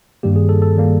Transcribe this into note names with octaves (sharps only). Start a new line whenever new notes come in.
G2 D#3 G3 A#3 G4
G#4
A4
A4
D#3 G3 A#3